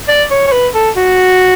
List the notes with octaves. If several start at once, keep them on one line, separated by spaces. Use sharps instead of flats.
D5
C#5
C#5
B4
A4
F#4